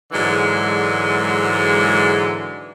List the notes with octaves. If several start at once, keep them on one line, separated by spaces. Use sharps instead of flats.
G#2 D3 E3 F#3 G#3